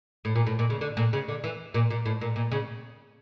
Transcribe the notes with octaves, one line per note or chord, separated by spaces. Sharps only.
A2
A#2
A2
A#2
C#3
D3
A#2
C#3
D3
E3
A#2
A#2
A2
A#2
A#2
C#3